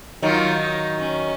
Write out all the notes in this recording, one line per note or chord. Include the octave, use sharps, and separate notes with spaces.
D#3 F#3 F4
D#4
C#4